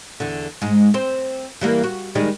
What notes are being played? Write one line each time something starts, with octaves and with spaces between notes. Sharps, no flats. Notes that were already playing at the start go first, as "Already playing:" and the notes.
E2 D3
G#2 G#3
C4 C5
E3 G3 A#3
F#4
D#3 G3 G#3